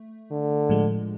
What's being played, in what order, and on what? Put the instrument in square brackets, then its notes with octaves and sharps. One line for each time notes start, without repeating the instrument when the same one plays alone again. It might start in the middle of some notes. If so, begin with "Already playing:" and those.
Already playing: [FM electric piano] A3
[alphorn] D3
[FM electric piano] A2 F3 G#3